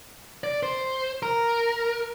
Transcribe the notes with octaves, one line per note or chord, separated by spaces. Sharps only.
D5
C5
A#4